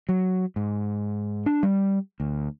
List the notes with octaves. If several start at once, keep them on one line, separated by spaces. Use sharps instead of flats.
F#3
G#2
D4
G3
D2